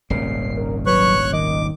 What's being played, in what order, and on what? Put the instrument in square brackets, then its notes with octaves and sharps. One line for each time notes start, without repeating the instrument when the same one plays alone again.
[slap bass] D#1 G#1 C#3 [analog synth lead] C7
[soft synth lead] A#4
[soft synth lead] F#3 [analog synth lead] B4 [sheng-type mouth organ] C#5 C#6 F#6
[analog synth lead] D#3 [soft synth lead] D#5 [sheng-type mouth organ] D6